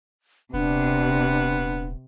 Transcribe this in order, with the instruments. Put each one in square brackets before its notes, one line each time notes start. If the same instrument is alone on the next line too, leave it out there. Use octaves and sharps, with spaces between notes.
[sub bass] D#1 [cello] C3 [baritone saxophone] B3 [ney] D4